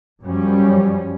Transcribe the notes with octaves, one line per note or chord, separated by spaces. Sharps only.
F#2 F3 G3 C#4